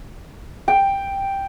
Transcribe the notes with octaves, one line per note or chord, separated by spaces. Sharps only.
G5